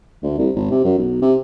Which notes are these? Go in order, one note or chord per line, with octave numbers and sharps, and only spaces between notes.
D2
C2
G#1
C3
F#2
B1
C3